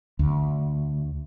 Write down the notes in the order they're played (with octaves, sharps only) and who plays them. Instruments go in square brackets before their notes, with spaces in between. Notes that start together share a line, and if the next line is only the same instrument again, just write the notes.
[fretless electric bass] D2